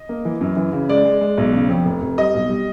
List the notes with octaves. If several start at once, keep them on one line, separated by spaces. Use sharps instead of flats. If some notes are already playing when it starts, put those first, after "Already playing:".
Already playing: D#5
A#3
E3
F#2
E3
C#3
G#3 D5
G#3
G#3
B1
C#3
F2
F1
F1
G3 D#5
B1
G3